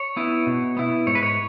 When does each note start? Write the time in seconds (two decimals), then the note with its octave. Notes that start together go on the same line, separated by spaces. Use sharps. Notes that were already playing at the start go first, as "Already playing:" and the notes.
Already playing: C#5
0.16 B3 E4
0.47 B2
0.77 B3 E4
1.07 G#2 C#5
1.15 B4
1.23 C#5